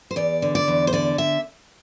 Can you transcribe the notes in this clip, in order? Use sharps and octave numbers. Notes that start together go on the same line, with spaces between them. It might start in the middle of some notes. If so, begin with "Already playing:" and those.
C5
E2 D5
D3
D5
E2
C5
D3 D5
E5